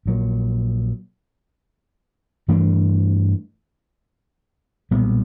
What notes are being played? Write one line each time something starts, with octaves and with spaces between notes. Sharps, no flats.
A#1 A#2 F#3
G2 E3 A3 D4
B1 A#2 G3 B3